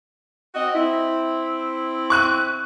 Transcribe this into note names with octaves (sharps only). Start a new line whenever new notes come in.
C4 F#4 D#5
C4 E4
C#6 F#6 D#7